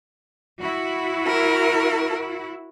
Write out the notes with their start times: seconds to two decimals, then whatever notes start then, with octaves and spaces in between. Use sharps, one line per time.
0.62 E4 F#4
1.26 A#4